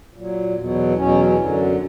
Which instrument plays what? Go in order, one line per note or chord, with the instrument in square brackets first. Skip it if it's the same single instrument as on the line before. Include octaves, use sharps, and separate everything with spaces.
[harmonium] A#2 F#3
E2 B2 F#3
E2 B2 F#3 C#4
F#2 D3 F#3